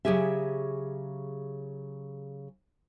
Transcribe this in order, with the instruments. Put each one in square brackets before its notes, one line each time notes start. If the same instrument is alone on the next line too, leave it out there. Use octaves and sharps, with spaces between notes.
[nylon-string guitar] C#3 F#3 G4 G#4 E5